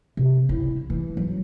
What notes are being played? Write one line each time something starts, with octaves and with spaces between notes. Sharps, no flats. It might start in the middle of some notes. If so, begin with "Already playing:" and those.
C3
E4
E3
F#3